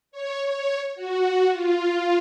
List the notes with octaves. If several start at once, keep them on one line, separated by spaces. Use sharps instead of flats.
C#5
C#5
F#4
F4